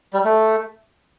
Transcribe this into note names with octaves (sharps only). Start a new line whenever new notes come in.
G3
A3